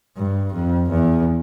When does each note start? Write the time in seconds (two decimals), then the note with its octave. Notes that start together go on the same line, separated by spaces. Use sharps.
0.16 G2
0.53 F2
0.89 E2